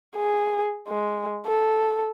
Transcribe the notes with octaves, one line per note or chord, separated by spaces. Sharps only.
G#4
G#3
A4